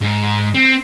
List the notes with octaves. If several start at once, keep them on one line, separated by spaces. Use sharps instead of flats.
G#2
C4